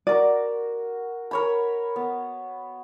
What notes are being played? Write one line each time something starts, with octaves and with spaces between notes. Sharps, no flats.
F#4 A#4 D5
A#4 C#5 B5
B3